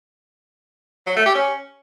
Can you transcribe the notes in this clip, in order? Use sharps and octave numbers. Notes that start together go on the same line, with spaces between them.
F#3
A3
G4
C#4